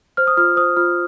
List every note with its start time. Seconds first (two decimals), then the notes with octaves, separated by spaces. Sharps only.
0.17 C5 F6
0.27 D#6
0.37 F4 F6
0.57 C5 D#6
0.77 F4 F6